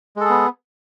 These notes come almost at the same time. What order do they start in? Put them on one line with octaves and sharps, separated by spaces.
G#3 A4 G#4 B3